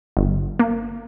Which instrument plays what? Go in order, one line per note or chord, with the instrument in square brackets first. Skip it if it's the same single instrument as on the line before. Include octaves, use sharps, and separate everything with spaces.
[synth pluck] G1
A#3